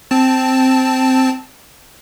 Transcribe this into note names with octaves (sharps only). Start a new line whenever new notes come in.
C4 A5